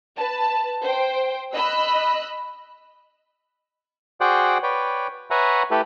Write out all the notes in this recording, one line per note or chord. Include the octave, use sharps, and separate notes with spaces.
B4 A5
C5 G5
D#5 B5 E6 F#6
F#4 G#4 C5 D5 F#5 G5
B4 C#5 D5 G5
B4 C#5 E5 F#5 G#5 A#5
A3 E4 G4 A4 B4